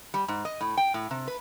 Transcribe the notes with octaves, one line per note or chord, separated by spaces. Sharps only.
G3
G#2
D#5
A2
G5
A2
C3
B4